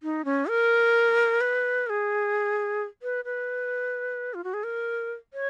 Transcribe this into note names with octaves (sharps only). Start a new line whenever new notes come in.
D#4
C#4
A#4
B4
A#4
G#4
B4
B4
F4
F#4
G#4
A#4
C#5